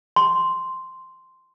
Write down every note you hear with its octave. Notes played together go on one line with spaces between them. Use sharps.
C6